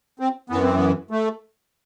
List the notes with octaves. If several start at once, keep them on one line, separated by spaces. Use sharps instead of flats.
C4
F#2 E3 B3
C4
B3
A3